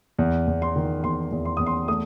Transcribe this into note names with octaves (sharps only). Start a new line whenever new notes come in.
E2
E2
C6
D#3
E2 C6
E2
C6
E2 D#6
C6
A3 D#6